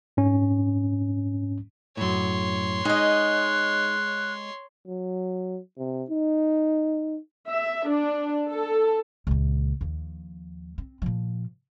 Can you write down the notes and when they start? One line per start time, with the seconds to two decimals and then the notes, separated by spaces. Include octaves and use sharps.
0.17 G#2 C#4
1.97 F#2 A2 C#5 C6
2.85 G#3 D#4 D#5 F#6
4.88 F#3
5.78 C3
6.10 D#4
7.49 E5
7.88 D4
8.50 A4
9.27 C#2 A#2
9.81 D#2 F3
10.78 C4
11.02 A#2 F3